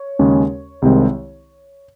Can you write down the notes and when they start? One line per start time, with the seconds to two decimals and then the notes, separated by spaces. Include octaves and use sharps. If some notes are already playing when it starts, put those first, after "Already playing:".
Already playing: C#5
0.19 D#2 C#3 G#3 C#4
0.82 C2 C3 D#3 G#3 C4